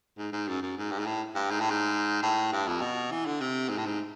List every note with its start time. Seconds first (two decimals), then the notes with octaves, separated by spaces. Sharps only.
0.18 G#2
0.33 G#2
0.48 F#2
0.63 F#2
0.78 G#2
0.91 G2
0.99 G#2
1.06 A2
1.35 G2
1.51 G#2
1.61 A2
1.70 G#2
2.23 A2
2.52 G2
2.68 F2
2.81 B2
3.11 E3
3.26 D3
3.41 C3
3.69 G#2
3.78 A2
3.86 G#2